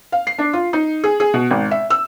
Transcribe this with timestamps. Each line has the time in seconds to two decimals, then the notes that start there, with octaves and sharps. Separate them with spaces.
0.12 F5
0.27 C7
0.38 D4
0.53 F4
0.73 D#4
1.04 G#4
1.20 G#4
1.34 B2
1.51 G#1
1.71 E5
1.90 E6